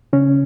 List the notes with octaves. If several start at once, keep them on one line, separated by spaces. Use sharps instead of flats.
C#3 C#4